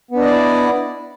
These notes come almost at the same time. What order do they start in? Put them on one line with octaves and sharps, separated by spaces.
B3 D4 D#5 D5 E4